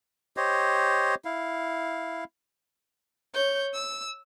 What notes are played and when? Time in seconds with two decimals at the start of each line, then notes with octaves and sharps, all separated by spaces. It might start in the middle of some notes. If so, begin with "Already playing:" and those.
0.37 G4 C5 C#5 D#5
1.25 E4 F5
3.34 C#5 G6
3.74 E6